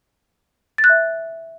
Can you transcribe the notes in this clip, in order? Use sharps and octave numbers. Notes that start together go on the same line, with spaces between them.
A6
F#6
E5